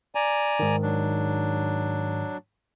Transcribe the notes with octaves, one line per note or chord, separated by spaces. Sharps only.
D5 G#5 A#5
G#2 D#3
F#3 D4